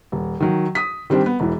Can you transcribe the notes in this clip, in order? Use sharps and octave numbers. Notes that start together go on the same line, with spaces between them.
D#1
D#3 F#3
D#6 B6
D#3 G3 C4 D4 G4
B3
E1 E3